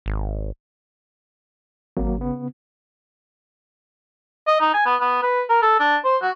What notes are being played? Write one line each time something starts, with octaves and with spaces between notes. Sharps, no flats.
G#1
G#1 F#3 A#3
C#3 B3
D#5
D#4
G#5
B3
B3
B4
A#4
A4
D4
C5
F#4